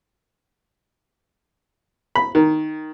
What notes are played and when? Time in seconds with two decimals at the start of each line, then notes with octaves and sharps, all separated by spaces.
2.16 B5
2.35 D#3